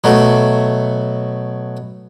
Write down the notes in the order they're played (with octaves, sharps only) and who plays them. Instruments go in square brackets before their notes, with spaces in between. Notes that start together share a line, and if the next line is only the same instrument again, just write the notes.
[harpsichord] B2 F#3 A3